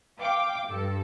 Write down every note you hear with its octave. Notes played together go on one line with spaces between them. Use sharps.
F5 G5 D6
G2 A4